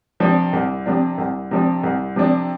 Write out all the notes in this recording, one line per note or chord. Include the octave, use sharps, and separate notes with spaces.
C3 F3 D4
C2
C3 F3 D4
C2
C3 F3 D4
C2
C3 F3 D4